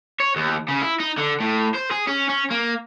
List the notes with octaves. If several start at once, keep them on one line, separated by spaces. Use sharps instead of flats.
C#5
D#2
C#3
E4
D#4
D3
A2
C5
G#4
C#4
C#4
A#3